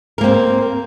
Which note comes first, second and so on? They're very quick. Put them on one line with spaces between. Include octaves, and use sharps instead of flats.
A#4 A#3 C4